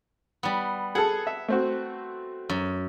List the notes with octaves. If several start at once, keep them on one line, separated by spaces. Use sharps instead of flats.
G3 B3
G#4 A4 F#5
E5
A3 C4 F#4
F#2